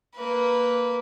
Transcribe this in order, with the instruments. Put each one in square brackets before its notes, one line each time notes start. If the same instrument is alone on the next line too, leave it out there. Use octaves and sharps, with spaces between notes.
[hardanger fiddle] A#3 B4